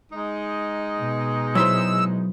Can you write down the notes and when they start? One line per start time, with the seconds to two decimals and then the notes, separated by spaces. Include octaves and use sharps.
0.12 G#3 D#4
0.99 B2
1.55 F#3 E4 C5 E6